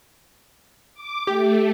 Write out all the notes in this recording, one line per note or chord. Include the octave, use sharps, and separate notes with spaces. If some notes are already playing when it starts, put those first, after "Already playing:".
D6
A3 G4